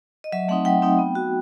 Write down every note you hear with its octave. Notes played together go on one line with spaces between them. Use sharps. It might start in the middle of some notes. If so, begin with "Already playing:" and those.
D#5
F#3 E5
A3 C4 D#4 F#5
F#3 G5
A3 C4 D#4
B3
F#4